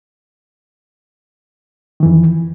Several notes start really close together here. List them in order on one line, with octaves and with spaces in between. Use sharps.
D#3 E3 F2